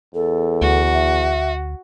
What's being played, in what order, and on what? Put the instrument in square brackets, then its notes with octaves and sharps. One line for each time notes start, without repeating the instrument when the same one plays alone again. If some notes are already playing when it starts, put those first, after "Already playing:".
[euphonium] E2 [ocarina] A4
[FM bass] D2 [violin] F#4
[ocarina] E5